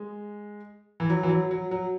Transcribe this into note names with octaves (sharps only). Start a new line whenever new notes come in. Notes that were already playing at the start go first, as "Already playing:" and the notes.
Already playing: G#3
E3
F#3
E3
F#3
F#3
F#3